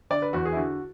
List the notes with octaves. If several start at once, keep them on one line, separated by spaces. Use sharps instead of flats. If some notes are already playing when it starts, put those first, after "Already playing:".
D3 D5
B4
E2 F#4
G#4
E4
D3 F#4